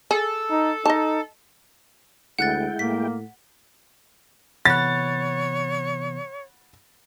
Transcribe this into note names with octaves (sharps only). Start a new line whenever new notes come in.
G#4 A4
D#4
D#4 D#5 A5
D2 G#3 E4 F#5 G5 F#6 A6
A2 A#3 B6
C3 E3 B3 C#5 F#5 B5 F#6 A6